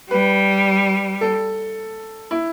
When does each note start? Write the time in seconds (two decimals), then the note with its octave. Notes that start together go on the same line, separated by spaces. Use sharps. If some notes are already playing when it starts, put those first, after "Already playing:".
0.11 G3 B4
1.21 A4
2.31 E4